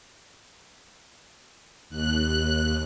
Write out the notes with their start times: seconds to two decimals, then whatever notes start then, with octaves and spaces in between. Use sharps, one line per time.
1.89 D#2 F#6